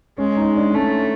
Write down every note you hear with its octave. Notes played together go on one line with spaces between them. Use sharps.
G#3 C#4
D#4
D4
A3 C#4